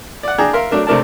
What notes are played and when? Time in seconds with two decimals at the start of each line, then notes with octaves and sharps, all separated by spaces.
0.23 D5 F#5
0.38 D4 G#4 G5 A#5
0.53 A#4 E5 F5 C6
0.71 F#3 A3 D4 A#4
0.87 C3 A3 D4 A#4 D5 A5